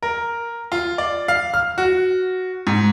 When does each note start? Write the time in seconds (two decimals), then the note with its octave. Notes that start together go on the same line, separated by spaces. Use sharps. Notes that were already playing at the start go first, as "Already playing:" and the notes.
0.03 A#4
0.72 F4
0.98 D5
1.28 F5
1.54 F6
1.78 F#4
2.67 G#2